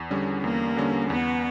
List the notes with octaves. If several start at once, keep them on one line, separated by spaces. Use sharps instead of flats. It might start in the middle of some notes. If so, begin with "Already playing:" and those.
Already playing: E2
D3 G3 C#4
E2 A#3
D3 G3 C#4
E2 B3